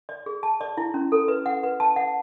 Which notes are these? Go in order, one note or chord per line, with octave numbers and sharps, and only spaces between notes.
D5
G#4
A5
D5
E4
C#4
A4
B4
F#5
B4
A5
F#5